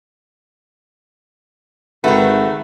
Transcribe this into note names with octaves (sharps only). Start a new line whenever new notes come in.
G#1 D#3 A3 F#4 B4